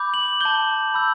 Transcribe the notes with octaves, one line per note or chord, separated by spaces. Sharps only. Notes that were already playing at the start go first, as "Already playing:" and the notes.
Already playing: B5 D6 G6
F#7
A5 D6 G6 G7
B5 E6 G6